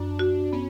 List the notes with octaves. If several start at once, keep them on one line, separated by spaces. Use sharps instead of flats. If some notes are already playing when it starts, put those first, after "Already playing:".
Already playing: F#2 D4
F#4
B3 C#4